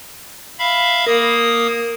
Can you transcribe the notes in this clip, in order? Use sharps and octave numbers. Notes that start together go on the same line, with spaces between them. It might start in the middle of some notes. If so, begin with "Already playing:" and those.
E5 F5 B5
A#3 A#4 D#6